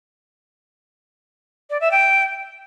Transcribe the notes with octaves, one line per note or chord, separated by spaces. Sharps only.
D5
E5
G5